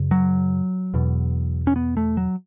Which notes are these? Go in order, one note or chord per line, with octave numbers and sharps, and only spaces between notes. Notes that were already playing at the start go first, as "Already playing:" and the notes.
Already playing: F#2 C#3
F#3
E2 B2
C#4
B3
A3
F#3